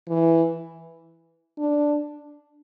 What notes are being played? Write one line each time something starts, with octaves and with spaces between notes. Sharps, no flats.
E3
D4